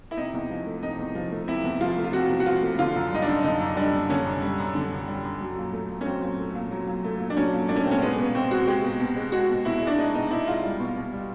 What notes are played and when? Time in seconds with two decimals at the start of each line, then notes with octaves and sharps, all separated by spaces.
0.11 E4
0.17 C3 D#4
0.34 E2
0.50 F3
0.66 A3
0.83 C3 D#4
0.99 E2
1.15 F3
1.31 A3
1.47 C3 E4
1.64 E2
1.81 F3 F4
1.97 A3
2.04 F4
2.13 C3 F#4
2.29 E2
2.40 F#4
2.46 F3 F4
2.62 A3
2.78 D3 F4
2.95 F#2
3.11 G3 D#4
3.22 D4
3.28 F#2
3.44 D3 D#4
3.60 F#2
3.77 G3 D4
3.93 F#2
4.09 D3 C#4
4.26 F#2
4.42 G3
4.58 F#2
4.75 D3
4.91 F#2
5.08 G3
5.24 F#2
5.41 F#3
5.57 A#2
5.73 A3
5.89 A#2
6.01 C#4
6.06 F#3 C4
6.22 A#2
6.39 A3
6.55 A#2
6.71 F#3
6.87 A#2
7.04 A3
7.20 A#2
7.30 D4
7.37 F#3 C#4
7.53 A#2
7.69 A3 D4
7.76 C#4
7.84 A#2 C4
7.91 C#4
8.02 G#3 B3
8.18 B2 B3
8.35 B2 C4
8.51 G#3 F#4
8.67 G#3 G4
8.84 B2
9.00 B2
9.16 G#3
9.32 G#3 F#4
9.49 B2
9.65 B2 E4
9.82 G#3
9.87 D4
9.98 G#3 D#4
10.14 B2 D#4
10.31 B2 E4
10.47 G#3 F4
10.63 G3
10.80 B2
10.96 B2
11.13 G3